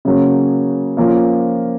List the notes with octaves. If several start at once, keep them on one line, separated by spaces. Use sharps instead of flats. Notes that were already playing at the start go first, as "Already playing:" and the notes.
C#3 F#3 A#3 C#4
F3 A#3 C#4 F4